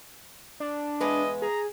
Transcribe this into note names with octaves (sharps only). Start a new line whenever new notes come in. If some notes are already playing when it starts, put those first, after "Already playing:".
D4
E2 G#3 B4 D#5
G#4 A#5